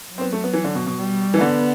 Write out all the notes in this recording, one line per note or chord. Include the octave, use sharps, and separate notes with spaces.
F#3
C4
B3
A3
B3
E3
D3
B2
B2
G3
E3
D3 B3